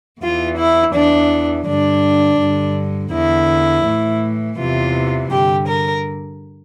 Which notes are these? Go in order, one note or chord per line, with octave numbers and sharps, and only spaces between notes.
E2 E3 F4
E4
E2 E3 D4
G2 D3 D4
G2 D3
E2 D3 E4
A2 E3
E2 C3 E3 F4
G2 D3 G4
A#4